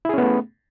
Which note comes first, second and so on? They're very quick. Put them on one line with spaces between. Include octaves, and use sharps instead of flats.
E4 G#4 C#4 B3 A3